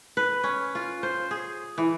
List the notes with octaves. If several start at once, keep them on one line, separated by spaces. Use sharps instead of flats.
B4
C#4
F4
C5
G#4
E3